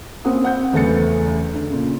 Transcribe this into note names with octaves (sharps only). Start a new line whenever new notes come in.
A#3 C4 C#4 F#5 D#6
C4 F#5 G6
F#1 E2 A3 B3 A6 C#7
D3
A#2 C#3